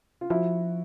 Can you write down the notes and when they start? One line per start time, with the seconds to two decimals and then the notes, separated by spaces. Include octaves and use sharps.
0.21 F4
0.30 F3 E4 F#4